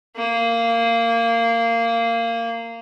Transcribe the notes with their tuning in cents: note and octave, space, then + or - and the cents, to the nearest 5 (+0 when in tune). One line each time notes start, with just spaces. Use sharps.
A#3 -15